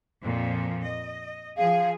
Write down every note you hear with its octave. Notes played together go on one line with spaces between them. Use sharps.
F2 A#2 F3
D#5
F3 G#4 F5